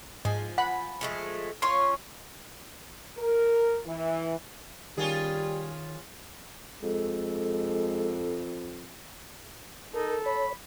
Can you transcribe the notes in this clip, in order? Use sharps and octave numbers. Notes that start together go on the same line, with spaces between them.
G#2 F3 G#5
F#5 B5
F3 G#3 A3
C#4 F4 C#5 C6
A#4
E3
D#3 G3 C#4 F4 G#4
F2 G#3 A4
D#4 A4 A#4
C#5 B5